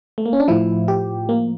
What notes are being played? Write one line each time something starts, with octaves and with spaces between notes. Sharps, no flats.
A3
A#3
C#4
D4
A2 F3 E4
G4
A#3